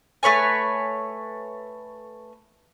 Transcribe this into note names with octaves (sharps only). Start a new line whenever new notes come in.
A3 B4 C#5 G#5